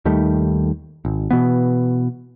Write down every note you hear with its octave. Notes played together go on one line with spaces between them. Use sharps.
D#2 D#3 G3 A3
G#1
B2 E3 B3